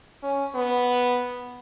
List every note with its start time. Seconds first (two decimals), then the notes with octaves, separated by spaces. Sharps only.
0.23 C#4
0.55 B3